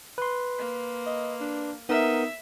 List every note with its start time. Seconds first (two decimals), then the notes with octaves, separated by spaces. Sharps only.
0.18 B4 C6
0.59 A#3
1.06 D#5
1.40 D4
1.89 B3 D#4 A#4 E5